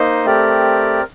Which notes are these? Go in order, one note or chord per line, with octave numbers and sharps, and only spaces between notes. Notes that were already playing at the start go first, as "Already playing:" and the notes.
Already playing: A#3 D#4 C5 D#5
A3 C4 G4 A#4 D5